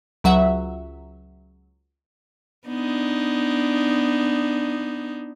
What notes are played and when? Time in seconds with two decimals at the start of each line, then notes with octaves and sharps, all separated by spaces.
0.24 C#2 F#3 E5 F#5
2.68 B3 D4 D#4